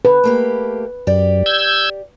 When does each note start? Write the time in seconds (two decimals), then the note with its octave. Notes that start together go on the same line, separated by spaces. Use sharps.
0.05 D3 B4
0.24 A3 A#3 G4
1.07 F#2 G4 D5
1.46 E6 G6 G#6